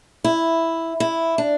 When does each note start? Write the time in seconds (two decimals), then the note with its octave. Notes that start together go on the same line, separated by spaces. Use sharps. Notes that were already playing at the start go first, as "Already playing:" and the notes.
0.24 E4
1.00 E4
1.38 D4